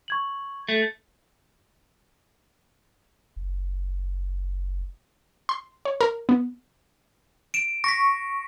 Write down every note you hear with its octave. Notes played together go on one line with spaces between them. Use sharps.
C#6 G#6 F#7
A3
F#1
C6
C#5
A#4
B3
D7 E7
C#6 A#6 B6